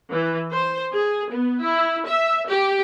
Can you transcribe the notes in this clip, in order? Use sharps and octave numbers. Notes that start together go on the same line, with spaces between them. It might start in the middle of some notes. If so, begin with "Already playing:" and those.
E3
C5
G#4
B3
E4
E5
G4